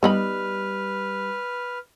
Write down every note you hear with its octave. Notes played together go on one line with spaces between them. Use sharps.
G3 B3 D#4 B4 B5 F6